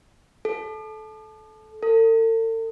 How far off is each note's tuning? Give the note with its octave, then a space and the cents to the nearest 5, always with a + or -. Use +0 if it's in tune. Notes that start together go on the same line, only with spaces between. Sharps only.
A4 -20
A4 +45